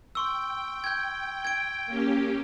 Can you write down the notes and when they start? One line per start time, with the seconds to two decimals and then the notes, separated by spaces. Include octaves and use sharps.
0.15 G5 C6 C#6 E6
0.84 G6 G#6
1.45 G#6 D7
1.86 A#3 C#4 G4